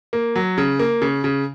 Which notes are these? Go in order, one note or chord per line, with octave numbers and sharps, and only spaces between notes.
A#3
F#3
C#3
A#3
C#3
C#3